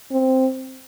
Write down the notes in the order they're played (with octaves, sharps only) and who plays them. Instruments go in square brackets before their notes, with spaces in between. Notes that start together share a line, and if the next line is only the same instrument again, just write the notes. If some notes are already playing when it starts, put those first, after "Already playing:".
[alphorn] C4